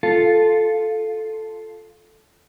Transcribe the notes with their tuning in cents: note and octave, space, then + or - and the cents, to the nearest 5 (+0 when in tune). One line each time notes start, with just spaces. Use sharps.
F4 +0 A4 -5